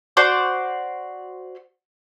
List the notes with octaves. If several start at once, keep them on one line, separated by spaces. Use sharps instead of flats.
F#4 C5 D5 G6